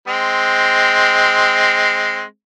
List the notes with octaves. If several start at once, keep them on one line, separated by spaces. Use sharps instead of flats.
G#3 C4